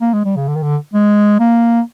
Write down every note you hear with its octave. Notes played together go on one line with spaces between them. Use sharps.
A#3
G#3
G3
C#3
D3
D#3
D3
G#3
A#3